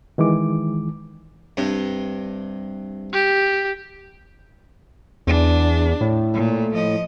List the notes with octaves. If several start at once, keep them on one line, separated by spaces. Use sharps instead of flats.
D#3 E3 G#3 D6
G2 C3
G4
E2 D4
A2
A#2
F3 D#5